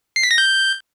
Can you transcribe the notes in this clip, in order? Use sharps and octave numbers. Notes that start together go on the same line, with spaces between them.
C7
B6
A#6
G6